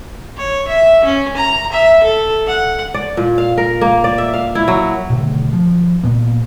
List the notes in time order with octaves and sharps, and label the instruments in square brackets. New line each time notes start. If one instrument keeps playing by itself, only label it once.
[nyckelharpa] C#5
E5
C#4
A#5
E5
A4
F#5
[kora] D5
A#2
F5
A#4
A#3
D5
E5
F5
E4
F#3
[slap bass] B2 D3 D#3 A3
F3
A#2 B3